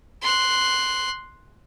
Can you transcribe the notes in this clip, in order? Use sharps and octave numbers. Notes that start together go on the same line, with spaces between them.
C6 F#6